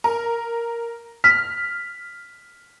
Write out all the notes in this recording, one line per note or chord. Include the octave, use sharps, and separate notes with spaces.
A#4
F6 B6